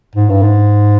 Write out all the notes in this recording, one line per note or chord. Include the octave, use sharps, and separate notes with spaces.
G#2
G2
G#2